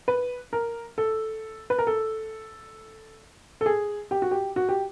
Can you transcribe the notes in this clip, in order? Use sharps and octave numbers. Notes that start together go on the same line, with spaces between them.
B4
A#4
A4
B4
A#4
A4
A4
G#4
G4
F#4
G4
F#4
G4